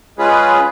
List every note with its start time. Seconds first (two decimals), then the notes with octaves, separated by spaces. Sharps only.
0.18 G#3 C#4 F4 G#4 B4